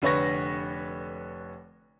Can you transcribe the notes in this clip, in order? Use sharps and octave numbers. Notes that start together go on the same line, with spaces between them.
F1 D3 B4 C#5 C#6 A#6